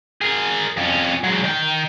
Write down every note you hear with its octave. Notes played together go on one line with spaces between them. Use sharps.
G#4 A#4
F2 C#4
F#3 G#3
D#3 G5